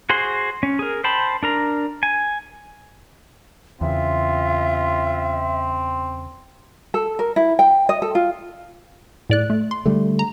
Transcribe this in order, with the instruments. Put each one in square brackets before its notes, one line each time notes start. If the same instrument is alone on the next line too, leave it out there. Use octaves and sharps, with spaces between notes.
[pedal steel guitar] F#4 G#4 C5 C6
C#4
G#4 A#4
C5 G5 A5 B5
D4 A#4 A#5
G#5
[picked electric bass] E2 C#3 [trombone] C4 [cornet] F4 [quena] E5
[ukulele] A4
A#4
E4
G5
D#5
A4
F4
[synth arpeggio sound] A2 D5 F#6
A3
C6
[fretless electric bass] D3 G3 A3
[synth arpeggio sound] A#5